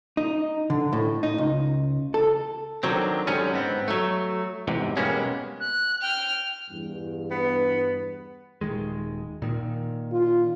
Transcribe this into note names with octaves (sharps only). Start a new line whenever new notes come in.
D#4
D3
A2
D#4
C#2
A4
D3 D#3 F3 F#3 C4
G#2 D3 F#3 G3 C#4 D#4
G#2 B3 C4
F#3 A3
E2 G#2 C3
B2 G3 G#3 A#3 B3 C#4
F#6
G5 F6
E2 G2
B3
D#1 D#3 G#3
A#2 D#3
F4